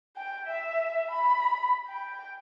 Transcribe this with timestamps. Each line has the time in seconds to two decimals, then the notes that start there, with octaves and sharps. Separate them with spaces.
0.17 G5
0.48 E5
1.11 B5
1.88 G5